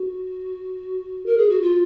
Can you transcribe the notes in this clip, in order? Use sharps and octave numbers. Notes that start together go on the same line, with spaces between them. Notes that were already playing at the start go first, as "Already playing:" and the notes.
Already playing: F#4
A#4
G#4
F#4
F4